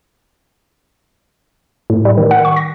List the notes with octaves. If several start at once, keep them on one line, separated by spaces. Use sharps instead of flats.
A2
G3
D#3
F#5
C#6
A#6